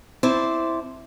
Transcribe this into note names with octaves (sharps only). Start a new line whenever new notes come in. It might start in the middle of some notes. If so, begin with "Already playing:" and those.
C4 E4 C5 D5 A5